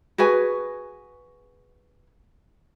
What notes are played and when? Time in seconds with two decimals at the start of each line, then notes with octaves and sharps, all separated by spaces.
0.18 F#4 G#4 B4 G#5